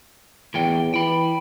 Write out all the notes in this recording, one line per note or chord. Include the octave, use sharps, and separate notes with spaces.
E2 A2 E3 G5
E3 G5 B5